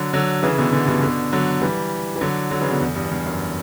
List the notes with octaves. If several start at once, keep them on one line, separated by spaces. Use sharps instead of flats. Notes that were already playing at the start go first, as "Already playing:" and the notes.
Already playing: D3 F#3
D3 F#3
C#3 E3
B2 D3
B2 D3
G2 B2
B2 D3
D3 F#3
E3 G3
E3
D3 F#3
D3 F#3
C#3 E3
B2 D3
E2
E2 G2
E2 G2
F#2